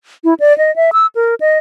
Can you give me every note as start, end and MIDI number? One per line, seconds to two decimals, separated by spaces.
0.24 0.34 64
0.40 0.56 74
0.58 0.74 75
0.76 0.90 76
0.93 1.06 88
1.15 1.35 70
1.40 1.58 75